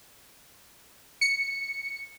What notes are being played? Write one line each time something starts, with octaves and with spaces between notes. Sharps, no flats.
C#7